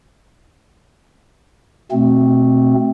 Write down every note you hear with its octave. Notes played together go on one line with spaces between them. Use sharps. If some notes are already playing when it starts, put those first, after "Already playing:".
B2 A3 C4